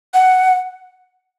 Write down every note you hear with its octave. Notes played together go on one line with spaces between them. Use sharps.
F#5